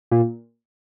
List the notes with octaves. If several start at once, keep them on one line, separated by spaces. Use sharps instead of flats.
A#2